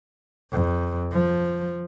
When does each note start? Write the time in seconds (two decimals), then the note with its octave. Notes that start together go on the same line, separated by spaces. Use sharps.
0.52 F2
1.12 F3